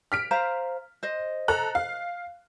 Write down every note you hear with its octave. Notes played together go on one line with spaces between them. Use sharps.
F6 B6 D7
C5 F5 A#5
C5 D#5
A4 A#5 F#6
F5